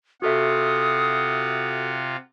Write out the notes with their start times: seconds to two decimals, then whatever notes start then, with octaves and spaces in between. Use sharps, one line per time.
0.22 C3 F4 F#4 A4 E5 F#5 D#6